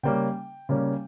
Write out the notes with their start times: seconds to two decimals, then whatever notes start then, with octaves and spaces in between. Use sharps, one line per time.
0.03 C#3 G3 A#3 C#4 G5
0.69 C#3 G3 A#3 C#4